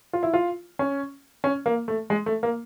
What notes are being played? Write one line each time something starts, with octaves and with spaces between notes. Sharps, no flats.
F4
E4
F4
C#4
C#4
A#3
A3
G#3
A3
A#3